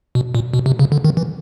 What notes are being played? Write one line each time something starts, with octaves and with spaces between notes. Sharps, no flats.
B2
A#2
B2
C3
C#3
D3
D#3
E3